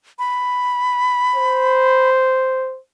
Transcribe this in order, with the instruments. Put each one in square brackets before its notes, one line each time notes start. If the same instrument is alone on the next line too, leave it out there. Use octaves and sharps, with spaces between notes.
[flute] B5
[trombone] C5